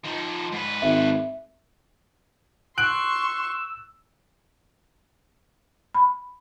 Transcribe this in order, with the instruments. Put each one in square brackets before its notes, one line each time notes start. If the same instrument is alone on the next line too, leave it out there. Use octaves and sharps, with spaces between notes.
[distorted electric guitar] F3 D#4
G#2 B4
[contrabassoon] G#1 [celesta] E5
[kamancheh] C6 C#6 [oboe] E6 [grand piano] F#6 D7 F#7
[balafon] B5